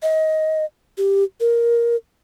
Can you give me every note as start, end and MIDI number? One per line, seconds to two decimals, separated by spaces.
0.03 0.65 75
0.98 1.24 67
1.40 1.96 70